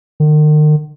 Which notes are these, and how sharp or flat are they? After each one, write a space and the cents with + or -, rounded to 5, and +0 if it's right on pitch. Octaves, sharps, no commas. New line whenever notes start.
D#3 -40